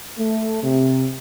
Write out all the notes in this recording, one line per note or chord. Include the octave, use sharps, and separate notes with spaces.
A3
C3